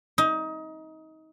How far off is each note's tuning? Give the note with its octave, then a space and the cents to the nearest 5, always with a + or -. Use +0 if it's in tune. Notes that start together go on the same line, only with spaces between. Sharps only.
D#4 +25